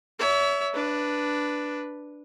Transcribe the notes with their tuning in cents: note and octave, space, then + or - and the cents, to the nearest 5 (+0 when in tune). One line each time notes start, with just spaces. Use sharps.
C#5 +35 E5 +0
D4 +0 B4 +0